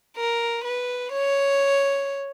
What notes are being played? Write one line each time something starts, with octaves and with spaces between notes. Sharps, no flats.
A#4
B4
C#5